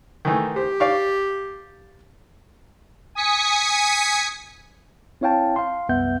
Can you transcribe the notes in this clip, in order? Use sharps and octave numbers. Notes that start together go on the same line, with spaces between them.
D#3 E3 A3
G4 C5
D5 F5 C#6
G#5 D#6 B6 C#7
C4 E4 C#5 F5 G5 A5
F5 C6
C2 F#2 B3 E5 F#5 G6